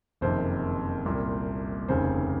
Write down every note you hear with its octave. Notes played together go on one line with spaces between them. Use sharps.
F#1 F2 C3 D#3 C5
C2 A#2
F1 D#2 C#3 C5